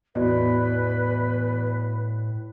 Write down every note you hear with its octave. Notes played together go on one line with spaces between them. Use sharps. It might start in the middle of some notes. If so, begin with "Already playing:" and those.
E2 A2 F#4 B4 D5 D#5